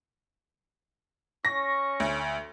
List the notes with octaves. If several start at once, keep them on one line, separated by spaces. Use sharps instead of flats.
C#4 C#6 A#6
D2